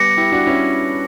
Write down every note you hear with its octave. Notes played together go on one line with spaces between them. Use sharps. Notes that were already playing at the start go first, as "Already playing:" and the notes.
Already playing: G3 B3 D6 A#6 C#7
E4 G4
D4 F#4
C#4 E4